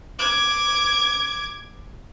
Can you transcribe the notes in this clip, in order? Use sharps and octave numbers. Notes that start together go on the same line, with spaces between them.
D6 G#6